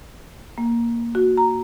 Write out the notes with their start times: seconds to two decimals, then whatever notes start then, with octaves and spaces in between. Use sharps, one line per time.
0.58 A#3
1.15 F#4
1.37 A#5